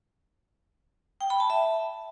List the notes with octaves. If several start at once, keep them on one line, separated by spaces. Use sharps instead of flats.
G5
B5
A5
E5